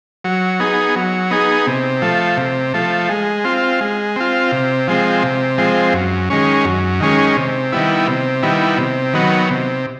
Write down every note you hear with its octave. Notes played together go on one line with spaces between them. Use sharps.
F#3
B3 D#4 G#4
F#3
B3 D#4 G#4
C3
F3 A3
C3
F3 A3
G#3
C4 F4
G#3
C4 F4
C3
F3 G#3 C4
C3
F3 G#3 C4
F#2
D#3 G#3 C#4
F#2
D#3 G#3 C#4
C3
D#3 G3 B3 E4
C3
D#3 G3 B3 E4
C3
D#3 F#3 B3
C3